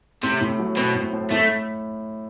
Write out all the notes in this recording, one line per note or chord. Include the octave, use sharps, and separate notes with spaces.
A2 C3
A2
F#3
B2 C4
A2
A2
A2 A3